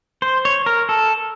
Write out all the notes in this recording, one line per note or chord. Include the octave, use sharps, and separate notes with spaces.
C5
C#5
A#4
A4